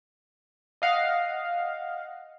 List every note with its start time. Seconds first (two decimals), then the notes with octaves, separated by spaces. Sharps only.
0.82 D#5 F5 F#5